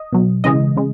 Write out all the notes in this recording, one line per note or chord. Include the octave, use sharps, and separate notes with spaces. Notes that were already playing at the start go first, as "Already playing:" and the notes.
Already playing: D#5
B2 F#3
C#3 E3 G#3 D#5
C#3 G#3